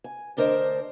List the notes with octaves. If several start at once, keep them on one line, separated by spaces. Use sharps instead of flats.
G#5
D2 D4 A#4 C5 D#5